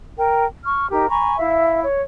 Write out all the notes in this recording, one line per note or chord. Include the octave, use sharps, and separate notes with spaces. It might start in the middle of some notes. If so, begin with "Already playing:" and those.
A#4 G5
C#6 F6
D#4 G4 A#4
G#5 A#5 B5 C#6
E4 E5 F5
C#5